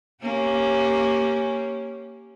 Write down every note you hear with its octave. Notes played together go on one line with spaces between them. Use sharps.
A#3 C#4 G4